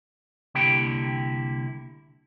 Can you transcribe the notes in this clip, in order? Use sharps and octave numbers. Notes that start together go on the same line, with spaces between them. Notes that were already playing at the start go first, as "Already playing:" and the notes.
C2 D3 A#3 E4 G4 G5